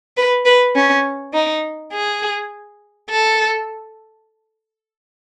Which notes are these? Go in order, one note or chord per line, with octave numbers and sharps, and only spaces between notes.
B4
B4
C#4
D#4
G#4
A4